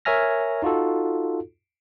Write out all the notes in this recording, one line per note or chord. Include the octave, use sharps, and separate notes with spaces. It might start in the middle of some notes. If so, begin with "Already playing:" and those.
A#4 C#5 E5 G#5 F6 A#6
D#4 F4 F#4 A4